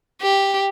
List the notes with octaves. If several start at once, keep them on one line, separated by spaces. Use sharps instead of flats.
G4